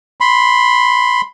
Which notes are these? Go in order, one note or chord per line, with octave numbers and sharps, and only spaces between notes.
B5 C6